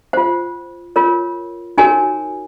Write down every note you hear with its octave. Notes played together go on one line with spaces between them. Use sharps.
F4 C5 F#5
F4 A#4 C#5
D#4 F#4 A#4 C#5 G#5